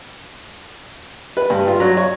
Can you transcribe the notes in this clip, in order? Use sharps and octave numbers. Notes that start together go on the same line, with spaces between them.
B4
G2
F4
F#3
C#5